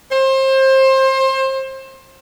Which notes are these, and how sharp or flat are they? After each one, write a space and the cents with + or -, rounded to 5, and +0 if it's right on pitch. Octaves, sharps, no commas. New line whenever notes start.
C5 +25